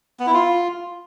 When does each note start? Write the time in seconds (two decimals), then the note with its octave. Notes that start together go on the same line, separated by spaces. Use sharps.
0.20 B3
0.27 E4
0.34 F4